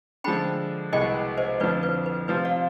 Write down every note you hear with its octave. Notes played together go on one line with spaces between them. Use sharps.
D3 F3 G#3 D4 G5 B5
C2 B2 G#3 B3 D#5 G5
C5 D#5
F2 D3 F3 B4 D5
B4 D5
B4
C3 F3 C4 F4 B4 D5
D5 F5